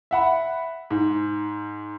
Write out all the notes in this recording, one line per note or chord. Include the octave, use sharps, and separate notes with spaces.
E5 F#5 B5
G#2